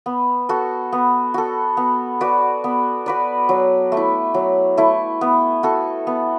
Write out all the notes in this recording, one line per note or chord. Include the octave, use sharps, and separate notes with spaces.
B3
F#4 A4
B3
F#4 A4
B3
F#4 B4 D5
B3
F#4 B4 D5
F#3
A3
E4
F#3
A3 E4
B3
F#4 A4
B3